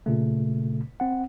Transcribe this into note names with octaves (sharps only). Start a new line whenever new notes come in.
A#2 C#3 A3
C4 F#5